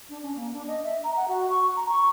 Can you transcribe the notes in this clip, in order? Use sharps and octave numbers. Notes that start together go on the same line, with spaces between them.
D4
C#4
A#3
D4
D#5
E5
A#5
F#5
F#4
C#6
A#5
C#6